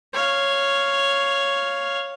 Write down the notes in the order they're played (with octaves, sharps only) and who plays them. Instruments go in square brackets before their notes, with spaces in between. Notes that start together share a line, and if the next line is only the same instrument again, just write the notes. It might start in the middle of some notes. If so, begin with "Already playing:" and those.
[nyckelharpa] C#5 F5